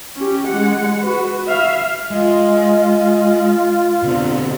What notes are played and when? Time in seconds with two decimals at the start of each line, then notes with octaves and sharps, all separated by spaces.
0.16 C#4 G4
0.47 G#3 F#5
0.99 F#4 B4
1.46 E5 F5
2.11 G#3 F4 D#5
4.03 B2 D3 C4